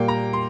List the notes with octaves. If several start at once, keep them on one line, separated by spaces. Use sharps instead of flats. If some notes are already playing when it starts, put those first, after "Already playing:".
Already playing: A#2 G3 A#3 G5
A#5
C6